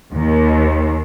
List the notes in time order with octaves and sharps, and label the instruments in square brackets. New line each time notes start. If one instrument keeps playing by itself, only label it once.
[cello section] D#2